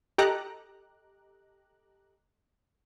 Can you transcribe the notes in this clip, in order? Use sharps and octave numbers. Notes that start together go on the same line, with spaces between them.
G4 A4 D#5 A#5 D6 F#6